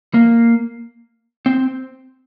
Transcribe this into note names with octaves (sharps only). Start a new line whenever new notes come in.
A#3
C4